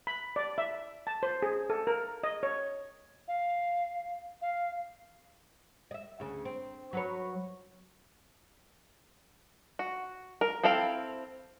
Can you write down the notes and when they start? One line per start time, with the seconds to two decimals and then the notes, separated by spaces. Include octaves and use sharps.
0.07 B5
0.36 D5
0.58 E5
1.07 A5
1.23 C5
1.42 G#4
1.70 A4
1.87 A#4
2.23 D#5
2.43 C#5
3.28 F5
4.42 F5
5.91 D#5 E5
6.20 D2 C#3
6.45 C4
6.93 F#3 B4 C#5
9.79 F#4
10.41 A#4
10.63 C4 E4 A4 F5 G5